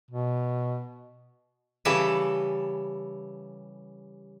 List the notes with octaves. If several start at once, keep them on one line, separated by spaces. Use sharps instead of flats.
B2
C#3 E3 G3 E4 A4 B4